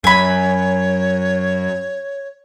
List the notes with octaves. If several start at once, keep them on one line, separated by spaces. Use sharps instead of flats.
F#2 C#5 G#5 B5